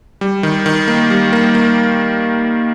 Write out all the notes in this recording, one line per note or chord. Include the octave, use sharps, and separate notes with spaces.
G3
D#3
D#3
A#3
G3
A#3
A#3